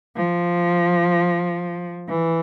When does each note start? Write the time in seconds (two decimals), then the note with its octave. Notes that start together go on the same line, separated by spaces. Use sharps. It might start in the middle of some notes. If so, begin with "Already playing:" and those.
0.16 F3
2.09 E3